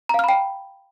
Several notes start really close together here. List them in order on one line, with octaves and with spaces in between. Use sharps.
A#5 F5 F6 B5 G5